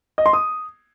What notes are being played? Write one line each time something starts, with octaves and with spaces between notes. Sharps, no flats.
D#5
C6
D#6